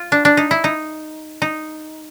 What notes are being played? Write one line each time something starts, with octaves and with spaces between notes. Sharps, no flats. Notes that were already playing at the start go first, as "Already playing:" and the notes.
Already playing: F4
D4
D4
D#4
E4
D#4
D#4